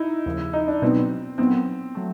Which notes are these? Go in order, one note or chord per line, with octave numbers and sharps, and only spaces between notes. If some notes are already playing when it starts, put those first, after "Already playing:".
Already playing: D#4 E4
D#2 C#3 F3
D#4
D4
B2 F#3 B3 C4 D#4
A#2 F#3 B3 C4 D#4
F#3 A3